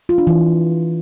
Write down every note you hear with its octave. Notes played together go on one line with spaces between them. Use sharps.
F4
D4
E3